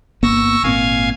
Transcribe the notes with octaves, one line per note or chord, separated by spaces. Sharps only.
G1 A#3 B3 C#6 E6 A#6
G#1 A#2 C4 F5 G#5